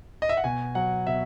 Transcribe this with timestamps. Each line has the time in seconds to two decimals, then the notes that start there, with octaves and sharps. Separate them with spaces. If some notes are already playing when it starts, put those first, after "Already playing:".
0.22 D#5
0.29 E5
0.37 F#5
0.44 B2 G#5
0.75 F#3 F#5
1.07 B2 E5